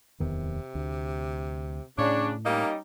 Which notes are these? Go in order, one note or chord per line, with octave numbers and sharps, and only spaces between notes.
D1 E2 C3 D#3
D2
A2 C#3 D4 C#5
G3 A#3 C#4 D#4